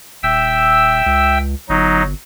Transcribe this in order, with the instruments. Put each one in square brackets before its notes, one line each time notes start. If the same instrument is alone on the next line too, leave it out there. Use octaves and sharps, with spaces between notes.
[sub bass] D#1 [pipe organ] E5 G5 E6
[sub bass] C#2
[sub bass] G1 [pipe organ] F#3 D#4